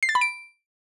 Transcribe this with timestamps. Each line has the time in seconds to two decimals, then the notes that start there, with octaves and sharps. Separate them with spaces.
0.03 C7
0.09 A6
0.15 B5
0.21 D7